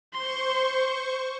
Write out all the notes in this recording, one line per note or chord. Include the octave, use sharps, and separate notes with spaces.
C5 C6 C#6